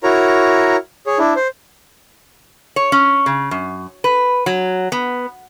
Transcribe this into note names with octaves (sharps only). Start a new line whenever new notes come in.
E4 F#4 A#4 C#5 A#5
G#4 C#5
D4 E4
C5
C#5
C#4
C#3
F#2
B4
F#3
B3